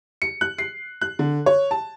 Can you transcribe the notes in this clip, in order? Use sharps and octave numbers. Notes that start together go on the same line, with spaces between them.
C#7
F#6
C7
F#6
D3
C#5
A5